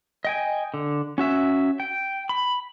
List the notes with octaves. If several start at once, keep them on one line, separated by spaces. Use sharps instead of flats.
D#5 G5 G#5
D3
C#4 F#4 E5
G5
B5